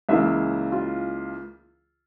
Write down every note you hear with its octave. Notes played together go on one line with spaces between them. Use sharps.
C#2 C#3 E3 A#3 E5
F4